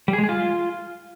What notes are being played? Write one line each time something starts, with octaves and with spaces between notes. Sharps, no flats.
G3
G#4
G#3
G#4
F4